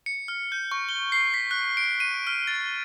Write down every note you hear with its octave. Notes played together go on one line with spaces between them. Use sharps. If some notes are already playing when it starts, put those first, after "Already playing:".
C#7
F6
G6
C#6
G7
C7
B6
F#6
D7
D#7
F6
A6